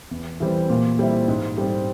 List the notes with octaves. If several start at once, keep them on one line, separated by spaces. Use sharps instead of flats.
E2
E3 G3 C4
A#2
G3 C4 E4
G#2
G3 C4